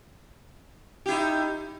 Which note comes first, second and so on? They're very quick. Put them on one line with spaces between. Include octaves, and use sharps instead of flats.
G4 E4 D#4